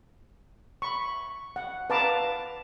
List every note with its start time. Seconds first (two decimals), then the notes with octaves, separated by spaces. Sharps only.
0.82 B5 C#6
1.56 F#5
1.90 B4 F5 A5 A#5 D6